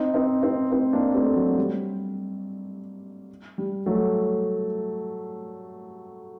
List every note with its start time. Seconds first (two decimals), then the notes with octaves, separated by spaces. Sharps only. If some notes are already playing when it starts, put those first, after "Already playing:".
Already playing: C4 D#4
0.14 C4 D#4
0.43 C4 D#4
0.72 C4 D#4
0.93 A#3 D4
1.15 A3 C4
1.36 F#3
1.58 G3
3.58 G3
3.86 F#3 A3